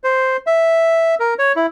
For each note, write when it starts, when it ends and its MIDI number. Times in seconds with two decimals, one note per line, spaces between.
0.04 0.37 72
0.47 1.15 76
1.20 1.34 70
1.39 1.52 73
1.56 1.66 64